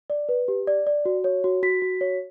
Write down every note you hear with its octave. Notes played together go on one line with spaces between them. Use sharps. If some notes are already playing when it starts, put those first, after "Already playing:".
D5
B4
G4
D5
D5
F#4
C#5
F#4
F#4 B6
F#4
C#5